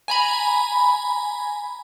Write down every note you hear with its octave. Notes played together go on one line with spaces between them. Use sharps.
G#5 A#5 B5